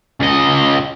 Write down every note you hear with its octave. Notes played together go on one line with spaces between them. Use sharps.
C#2 D#5